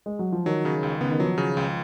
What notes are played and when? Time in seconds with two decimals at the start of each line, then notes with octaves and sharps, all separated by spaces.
0.06 G#3
0.19 F#3
0.32 F3
0.46 D#3 F#3
0.65 C#3
0.83 C#2
1.01 C#3 B3
1.10 D#3
1.20 F3 F#3
1.38 C#3
1.57 C#2